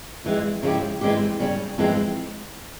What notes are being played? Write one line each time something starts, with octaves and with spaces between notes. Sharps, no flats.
F2 E3 G#3
C#3 F3 G#3 E4 G4
E3 G#3 C4 G4
C#3 G3 C#4
F2 E3 G#3 C4